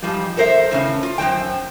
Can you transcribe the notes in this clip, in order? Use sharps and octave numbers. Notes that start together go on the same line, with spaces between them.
G#2 F3 G3
A4 A#4 C5 D5 E5
A2 C#3 C#4
F4
F#2 G#3 C5 G5